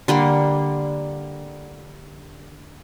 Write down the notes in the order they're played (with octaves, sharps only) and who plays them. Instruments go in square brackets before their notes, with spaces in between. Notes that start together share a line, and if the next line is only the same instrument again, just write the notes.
[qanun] D3 G3 A#3